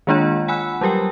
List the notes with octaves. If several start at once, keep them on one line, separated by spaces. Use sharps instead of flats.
D#3 G#3 A#3 D4 F4 C#5
F#5 G#5 B5 E6 F#6
F#3 G3 G4 A#4 G5